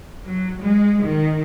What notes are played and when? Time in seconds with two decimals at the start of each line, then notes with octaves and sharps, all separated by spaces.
0.25 F#3
0.61 G#3
1.04 D#3